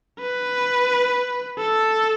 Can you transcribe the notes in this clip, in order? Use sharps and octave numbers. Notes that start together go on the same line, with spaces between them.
B4
A4